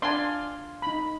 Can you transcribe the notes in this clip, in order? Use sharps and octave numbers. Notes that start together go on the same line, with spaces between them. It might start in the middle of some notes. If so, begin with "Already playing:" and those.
D4 F4 G#5 C6
D#4 B5